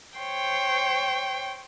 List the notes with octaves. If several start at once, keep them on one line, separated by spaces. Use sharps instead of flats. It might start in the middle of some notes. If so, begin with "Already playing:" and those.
C5 C#5 G5